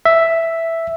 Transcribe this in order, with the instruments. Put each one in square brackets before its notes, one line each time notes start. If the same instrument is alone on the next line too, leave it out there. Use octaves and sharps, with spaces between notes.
[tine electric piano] E5